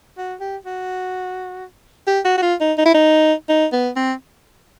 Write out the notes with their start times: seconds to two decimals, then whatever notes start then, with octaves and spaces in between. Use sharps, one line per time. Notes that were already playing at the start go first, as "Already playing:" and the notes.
0.17 F#4
0.40 G4
0.65 F#4
2.07 G4
2.25 F#4
2.38 F#4
2.42 F4
2.60 D#4
2.78 D#4
2.85 E4
2.94 D#4
3.49 D#4
3.72 B3
3.96 C4